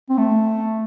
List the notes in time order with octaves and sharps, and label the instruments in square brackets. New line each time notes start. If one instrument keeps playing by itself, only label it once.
[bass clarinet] C4
A3